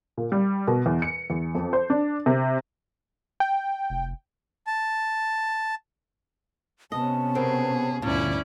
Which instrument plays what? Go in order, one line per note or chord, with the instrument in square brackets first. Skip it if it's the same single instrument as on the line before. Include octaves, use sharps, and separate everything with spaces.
[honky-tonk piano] A#2
G3
B2
E2
C#7
E2
F2
C5
D4
C3
[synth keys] G5
[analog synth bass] F1
[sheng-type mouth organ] A5
[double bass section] C3 B3 C#4 [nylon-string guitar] D#5 [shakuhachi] A5
[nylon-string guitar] B2 C4 A#4 [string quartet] G#4
[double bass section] G1 D2 D3 [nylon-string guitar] A#2 [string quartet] C#4 E4 D5